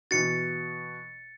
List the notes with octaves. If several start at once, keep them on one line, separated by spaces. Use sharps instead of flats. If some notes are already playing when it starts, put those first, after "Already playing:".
B2 E3 A6 C#7